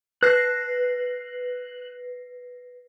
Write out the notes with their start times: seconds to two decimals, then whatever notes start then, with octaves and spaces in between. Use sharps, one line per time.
0.23 B4 F#6 A#6 C7